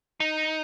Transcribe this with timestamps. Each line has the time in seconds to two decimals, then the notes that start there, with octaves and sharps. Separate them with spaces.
0.20 D#4